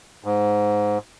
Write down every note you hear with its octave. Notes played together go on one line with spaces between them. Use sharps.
G#2